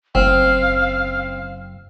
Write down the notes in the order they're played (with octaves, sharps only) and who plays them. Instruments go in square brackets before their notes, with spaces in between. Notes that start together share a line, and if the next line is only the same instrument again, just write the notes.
[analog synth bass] F#1 [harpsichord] C4 [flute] F5